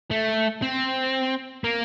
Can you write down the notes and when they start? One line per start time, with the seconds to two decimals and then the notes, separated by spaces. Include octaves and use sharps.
0.11 A3
0.62 C4
1.64 A#3